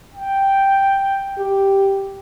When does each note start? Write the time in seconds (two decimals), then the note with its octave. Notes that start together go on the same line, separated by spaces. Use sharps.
0.14 G5
1.38 G4